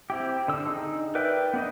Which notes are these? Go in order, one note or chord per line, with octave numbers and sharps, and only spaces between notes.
C4 E4 G4
D3 E6
D#4 G#4
A#4 B4 D5 E5 G5
B3 D4 D#5